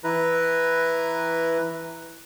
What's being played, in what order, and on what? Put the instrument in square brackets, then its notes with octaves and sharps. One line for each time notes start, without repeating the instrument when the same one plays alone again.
[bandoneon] E3 E4 B4 A#5